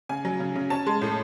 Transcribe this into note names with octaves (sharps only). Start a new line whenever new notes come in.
C#3 G#5
F#3
C#3
C#3
C#4 A5
G#3
A2